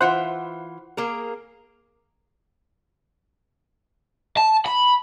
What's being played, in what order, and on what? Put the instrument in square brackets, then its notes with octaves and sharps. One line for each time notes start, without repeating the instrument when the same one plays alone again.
[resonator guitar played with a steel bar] E3 F4 E5 [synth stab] C5 F#5
[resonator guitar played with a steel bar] A#3 G#4 A#4
[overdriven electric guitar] A5
B5